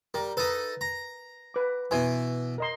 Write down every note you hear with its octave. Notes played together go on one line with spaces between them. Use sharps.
G3 A#4
D#4 A4 B4
A#5
B4 D6
B2 E3 G#5 C6
A#4 D#5 C6